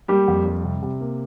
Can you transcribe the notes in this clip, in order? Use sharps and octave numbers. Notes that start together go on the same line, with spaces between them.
G3 A#3 G4
F2
G3
C3
C3
A#3